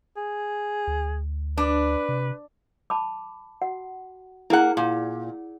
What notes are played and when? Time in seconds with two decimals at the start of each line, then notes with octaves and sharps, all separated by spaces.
0.17 G#4
0.87 D2
1.57 D4 B4
2.09 C3
2.90 A5 B5 D6
3.62 F#4 F#5
4.50 A#3 E4 G#4 F#5
4.77 A#2